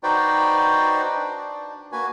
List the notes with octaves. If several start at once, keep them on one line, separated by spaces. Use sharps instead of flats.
D#4 F#4 B4 C5 D5 G5
D4
A#3 F#4 B4 G#5